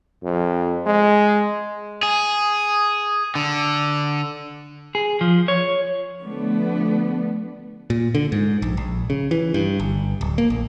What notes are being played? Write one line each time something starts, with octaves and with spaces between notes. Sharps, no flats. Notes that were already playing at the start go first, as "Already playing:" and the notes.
F2
G#3
G#4
D3
G#4
F3
C#5
D3 F3 A3 B3 D4
A#2
D3
G#2
A#1
A#1
C#3
E3
G2
G1
D1
A#3
A#1